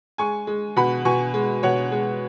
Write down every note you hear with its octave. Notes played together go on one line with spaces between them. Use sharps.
G#3 G#5 C#6
G#3
B2 F#5 B5
B2 G#5 C#6
G#3
B2 C#5 F#5
G#3